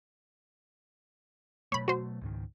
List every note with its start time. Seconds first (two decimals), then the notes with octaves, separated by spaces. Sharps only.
1.72 B2 F#3 A3 C#5 B5
1.88 F#4 C5
2.21 C#2 G#2 D#3